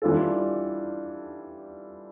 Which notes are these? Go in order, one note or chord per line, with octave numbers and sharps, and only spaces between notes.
E3 G3 D4 F4 A4